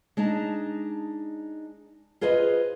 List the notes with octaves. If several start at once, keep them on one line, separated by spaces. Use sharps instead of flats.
G#3 D4 D#4 A5
F4 G#4 B4 C5 D#5